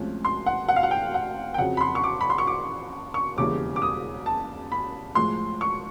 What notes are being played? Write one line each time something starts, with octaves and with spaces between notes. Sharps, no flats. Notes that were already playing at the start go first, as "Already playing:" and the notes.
Already playing: D2 C3 F3 G#3 C#4
C6
F#5
F#5
F5
F#5
G5
F#5
G5
F2 C#3 F#3 F#5
B5
C6
C#6
D6
B5
C6
C#6
D6
C#6
E1 D#2 C#3 E3 G3 D6
D6
D#6
A5
B5
A2 F3 G#3 C6
C#6